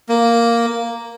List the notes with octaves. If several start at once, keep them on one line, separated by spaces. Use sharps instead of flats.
A#3